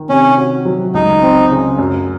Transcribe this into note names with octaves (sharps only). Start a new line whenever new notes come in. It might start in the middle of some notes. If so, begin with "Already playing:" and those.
Already playing: D#3
C3 C#4
F#4
F#3
C#2 D#4
C4
C#3
F#2